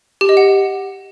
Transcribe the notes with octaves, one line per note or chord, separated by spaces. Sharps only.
G4
D#5
F#5